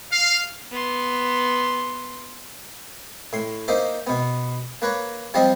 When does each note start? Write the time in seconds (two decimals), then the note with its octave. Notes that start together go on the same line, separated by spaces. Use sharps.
0.11 F5
0.71 B3 C6
3.33 A2 C6
3.68 A#3 D#4 C5 E5 D6
4.07 B2 B3
4.82 A#3 B4 C#5 A#5
5.34 F3 G3 C4 D4 D#5